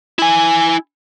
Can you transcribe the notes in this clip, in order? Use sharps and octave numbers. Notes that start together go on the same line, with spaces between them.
E4 G#5